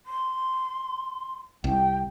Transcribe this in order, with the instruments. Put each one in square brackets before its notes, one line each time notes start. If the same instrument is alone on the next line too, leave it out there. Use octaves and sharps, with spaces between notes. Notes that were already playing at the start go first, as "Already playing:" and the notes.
[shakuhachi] C6
[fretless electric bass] C2 [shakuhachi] G5